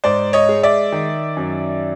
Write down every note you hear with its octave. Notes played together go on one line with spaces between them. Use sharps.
G#2 C5 D5
C#5 D#5
G#3
D5 E5
D#3
F#2